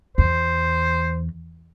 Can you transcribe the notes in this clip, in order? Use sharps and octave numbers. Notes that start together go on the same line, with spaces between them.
E2 C5